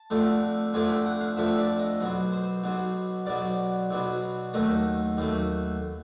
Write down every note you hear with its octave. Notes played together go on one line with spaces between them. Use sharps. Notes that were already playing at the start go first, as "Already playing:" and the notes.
Already playing: A5
F2 D3 F3 A3
F2 D3 F3 A3 G#5
G5
F#5
F5
F2 D3 F3 A3 E5
D5
D#5
B1 B2 F#3
C5
B1 B2 F#3
B1 B2 F#3 D5
B1 B2 F#3
D#2 D#3 F#3 A3 D#5
D#2 D#3 F#3 A3